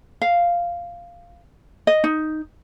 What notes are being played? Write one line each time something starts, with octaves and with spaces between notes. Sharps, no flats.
F5
D#5
D#4